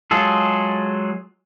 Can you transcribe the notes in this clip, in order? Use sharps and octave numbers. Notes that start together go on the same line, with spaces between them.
F#3 G#3 F4 G#4 A4